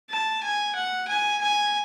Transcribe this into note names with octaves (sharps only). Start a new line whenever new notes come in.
A5
G#5
F#5
G#5
G#5